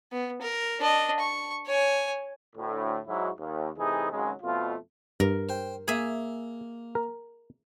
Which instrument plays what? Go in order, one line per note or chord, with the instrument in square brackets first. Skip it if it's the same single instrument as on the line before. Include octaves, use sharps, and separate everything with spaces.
[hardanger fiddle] B3
A#4
D4 D#5
C#6
C#5 G#5
[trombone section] D2 A2
G#2 F#3 D#4 E4 F#4
D#2
C3 E3 A3 D#4 G#4
G#1 C#3 F#3 G#3
F2 B2 A3 F4
[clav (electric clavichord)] G2 [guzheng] A#4
[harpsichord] C5 G5
[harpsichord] A#3 [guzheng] G#4 E5
[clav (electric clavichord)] A#4